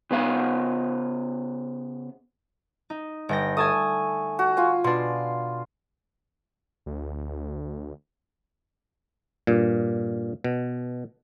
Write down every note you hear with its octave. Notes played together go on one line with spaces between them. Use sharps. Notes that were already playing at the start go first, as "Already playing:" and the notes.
C#3 B3 F5 F#5
D#4
G1 G5 A#6
A3 G#5 A5 D#6
F#4
F4 G#5
B2 D4 C6
D2
G2 A#2
B2